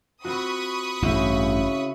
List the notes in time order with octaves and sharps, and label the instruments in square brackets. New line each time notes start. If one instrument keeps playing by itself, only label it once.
[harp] C4 F4 F#4 [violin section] B5 C#6 D#6
[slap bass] A1 G2 [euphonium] C#3 [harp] E4 F#4 E5